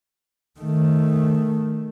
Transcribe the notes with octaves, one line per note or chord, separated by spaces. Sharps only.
D#3 A3